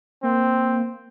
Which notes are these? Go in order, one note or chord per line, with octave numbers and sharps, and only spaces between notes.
A#3 C4